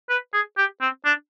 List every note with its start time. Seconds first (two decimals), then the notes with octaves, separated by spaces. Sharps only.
0.10 B4
0.34 G#4
0.58 G4
0.81 C4
1.05 D4